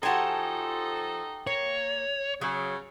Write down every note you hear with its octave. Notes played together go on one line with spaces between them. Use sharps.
F3 D#4 F#4 G4 A4 G#5 A5
A#3 C#5
C#3 F#3